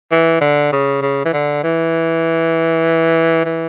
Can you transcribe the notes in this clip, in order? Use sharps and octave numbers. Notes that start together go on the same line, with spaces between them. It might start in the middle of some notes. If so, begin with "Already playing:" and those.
E3
D3
C#3
C#3
E3
D3
E3
E3